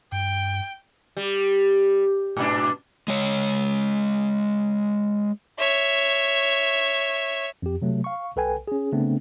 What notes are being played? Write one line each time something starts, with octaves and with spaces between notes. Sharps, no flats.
G2 G5
G3
G#2 B2 D4
G#3 C#5
C#5 E5
F2 G4
C3 F#3 A3
F5 C#6
B1 A4 B4 G5 G#5
C#4 G#4
C#3 A3 B3 C4 D4